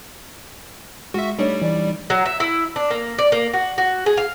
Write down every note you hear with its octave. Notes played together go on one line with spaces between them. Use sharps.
G#3 F4 F#4 E5
G3 A3 D4 D#4 C#5
E3 D5
F#3
E5
E4
D4
A#3
D5
A#3
F#4
F#4
G#4
F5